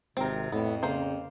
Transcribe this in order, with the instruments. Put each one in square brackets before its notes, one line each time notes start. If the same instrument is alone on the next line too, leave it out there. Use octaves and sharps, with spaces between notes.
[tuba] G#1 [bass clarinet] C3 [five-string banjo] C4 A#4
[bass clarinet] F2 [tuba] A2 [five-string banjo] B3
[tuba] C#3 [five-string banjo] A#3 C5